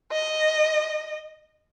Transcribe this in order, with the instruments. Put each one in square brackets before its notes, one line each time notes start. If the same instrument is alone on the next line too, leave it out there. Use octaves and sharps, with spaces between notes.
[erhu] D#5